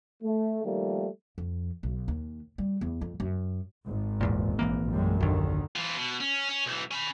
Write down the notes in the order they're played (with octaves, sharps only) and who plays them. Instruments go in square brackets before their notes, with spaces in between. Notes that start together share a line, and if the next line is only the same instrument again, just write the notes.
[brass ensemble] A3
D#3 F3 G3 A3 A#3
[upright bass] F2
B1
D#2
G3
E2
F2
F#2
[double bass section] G#1
[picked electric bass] D1 E2 A#2
A#1 E3 A#3
[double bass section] F#2 G3 G#3
[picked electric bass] A#1 D#2 [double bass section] D3 D#3
[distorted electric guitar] E3 F4
B2
C#4
C#4
B1 E3
C#4 B5